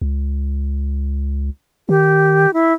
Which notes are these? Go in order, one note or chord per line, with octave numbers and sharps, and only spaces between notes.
C#2
D#3 G4
E4